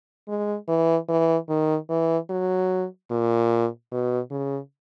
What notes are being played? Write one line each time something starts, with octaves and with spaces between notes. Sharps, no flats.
G#3
E3
E3
D#3
E3
F#3
A#2
B2
C#3